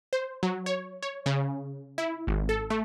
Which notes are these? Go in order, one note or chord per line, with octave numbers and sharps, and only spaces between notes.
C5
F#3
C#5
C#5
C#3
E4
G#1
A4
A3